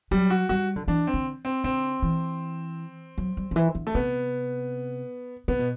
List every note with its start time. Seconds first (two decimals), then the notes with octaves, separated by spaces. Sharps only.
0.11 F#3 G3
0.30 F#4
0.49 G3 F#4
0.76 D3
0.88 E3 D4
1.07 C4
1.14 D3
1.45 C4
1.64 D3 C4
2.03 E3
3.18 F#3
3.37 G3
3.51 D3
3.56 E3
3.75 D3
3.87 A3
3.95 C3 B3
5.48 C3 B3
5.59 B2